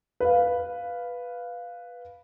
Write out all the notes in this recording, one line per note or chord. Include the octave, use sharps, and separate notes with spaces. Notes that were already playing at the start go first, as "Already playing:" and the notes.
B4 F5